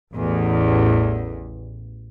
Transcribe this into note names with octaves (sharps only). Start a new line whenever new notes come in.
A1 E2